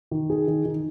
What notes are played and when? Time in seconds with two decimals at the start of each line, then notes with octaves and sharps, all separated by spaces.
0.11 D#3
0.30 G#4
0.48 D#3
0.65 D#3